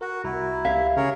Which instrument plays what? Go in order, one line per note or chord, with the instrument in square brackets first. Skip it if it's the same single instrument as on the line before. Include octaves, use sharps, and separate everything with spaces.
[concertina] F#4 [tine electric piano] A#4
[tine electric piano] C2 F#4 A#5 [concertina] E4
[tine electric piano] C#2 G4 G#6 [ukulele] E5 F5
[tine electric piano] C#3 [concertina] G#4 A#4 C#5